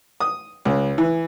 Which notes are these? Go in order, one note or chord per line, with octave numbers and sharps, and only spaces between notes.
D#6
C#2
E3